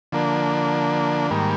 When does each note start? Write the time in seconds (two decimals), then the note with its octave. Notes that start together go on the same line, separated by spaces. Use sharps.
0.12 D3 F3 A#3 D4
1.30 G#2 D#3 G3 A#3